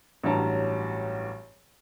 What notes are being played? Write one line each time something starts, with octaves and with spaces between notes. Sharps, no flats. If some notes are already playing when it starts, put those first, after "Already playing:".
A1 G2 E3 F#3 A5 A#5